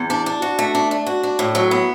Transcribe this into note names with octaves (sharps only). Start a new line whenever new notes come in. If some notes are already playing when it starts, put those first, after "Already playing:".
Already playing: E2
D4
D4
F#4
A3
D4
D4
F#4
D4
A2
F#3
B3